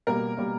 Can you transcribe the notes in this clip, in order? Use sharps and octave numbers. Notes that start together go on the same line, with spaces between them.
B2 G3 A#3 A#4
B2 G3 A#3